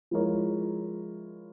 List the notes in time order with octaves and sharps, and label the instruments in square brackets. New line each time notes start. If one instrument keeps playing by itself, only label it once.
[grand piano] F3 G#3 E4 A#4 C#5